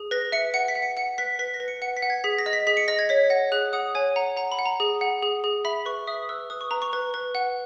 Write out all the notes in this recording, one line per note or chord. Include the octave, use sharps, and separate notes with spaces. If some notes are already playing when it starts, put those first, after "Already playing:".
Already playing: G#4
B4 A#6
E5 C#7
F#5 C#7
B6
F#5
C#7
F#5 C#7
B4 B6
B4 B6
A#6
B4
C#7
F#5 C#7
B6
F#5
G#6
G#4 B6
A#6
D#5
B6
G#4 B6
C#7
D#5 A#6
G#6
C#5 B6
F#5 A#6
G#4 F#6
F#5 D#6
C#5 G#5
F#5 A#5
F#5 A#5
B5
F#5
A#5
G#4
F#5
G#4
G#4
E5 B5
B4 C#6
E5 D#6
B4 E6
B4 D#6
C#6
B4 A#5
C#6
B4
B4
F#5